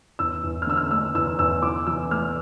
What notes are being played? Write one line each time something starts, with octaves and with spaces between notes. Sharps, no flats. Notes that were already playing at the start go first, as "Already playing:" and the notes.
E2 E6
E2
F6
D3 E6
F6
A3 E6
E2 E6
E2 E6
E3 D6
E3 E6
A3 F6